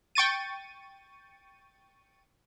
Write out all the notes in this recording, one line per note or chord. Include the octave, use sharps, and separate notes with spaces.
G5 C#6 A6 D#7